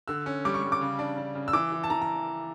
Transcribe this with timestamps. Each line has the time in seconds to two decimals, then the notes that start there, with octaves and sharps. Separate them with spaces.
0.08 D3 E6
0.26 C#4
0.45 G3 D6
0.54 C#6
0.62 G3
0.72 D6
0.81 C#3
0.99 D4
1.18 D4
1.35 C#3
1.48 E6
1.53 E3 D6
1.72 E3
1.84 A5
1.90 E3 A#5
2.02 A#5